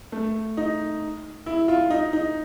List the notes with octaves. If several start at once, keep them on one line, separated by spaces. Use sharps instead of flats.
A3
D#4
E4
F4
D#4
D#4